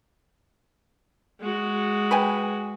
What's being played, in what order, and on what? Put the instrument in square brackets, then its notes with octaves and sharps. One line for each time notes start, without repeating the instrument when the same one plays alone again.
[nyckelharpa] G#3 F#4
[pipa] B4 G5 G#5